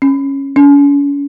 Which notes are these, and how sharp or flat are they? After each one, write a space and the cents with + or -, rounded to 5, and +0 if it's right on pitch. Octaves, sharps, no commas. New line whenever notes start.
C#4 -10
C#4 +40